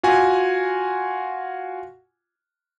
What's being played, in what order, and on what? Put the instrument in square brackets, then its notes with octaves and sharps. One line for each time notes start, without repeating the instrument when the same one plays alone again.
[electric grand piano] F4 F#4 G#5